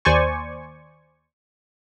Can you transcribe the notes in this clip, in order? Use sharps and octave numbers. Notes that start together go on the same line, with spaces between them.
D#2 C5 D5 G#5 C#6